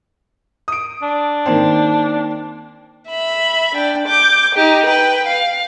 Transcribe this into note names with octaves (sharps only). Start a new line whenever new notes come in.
D#6 D7
D4
D#3 A#3 C4
E5 B5
D4 G5
D6 G6
D#4 G4
B4 G5
F5